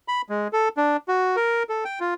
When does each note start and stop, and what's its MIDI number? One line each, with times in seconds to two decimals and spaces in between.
0.08 0.22 83
0.29 0.48 56
0.53 0.69 69
0.77 0.97 62
1.08 1.36 66
1.36 1.63 70
1.69 1.84 69
1.85 1.99 79
2.00 2.14 65